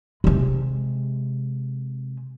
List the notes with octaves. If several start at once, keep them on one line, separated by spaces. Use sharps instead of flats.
C3 G#3